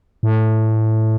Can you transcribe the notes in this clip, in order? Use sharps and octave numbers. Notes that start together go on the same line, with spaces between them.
A2